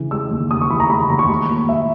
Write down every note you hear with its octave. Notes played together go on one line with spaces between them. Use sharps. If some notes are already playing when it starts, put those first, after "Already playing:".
Already playing: C#3 E3
G#3 E6
D#2
C#3 D#6
C#6
E3 B5
A#5
G#3 B5
B5
D#2 A#5
C#6
G#3 B5
A#2
G#3 E5